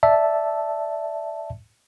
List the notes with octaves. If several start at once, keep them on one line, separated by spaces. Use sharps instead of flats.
D5 E5 A5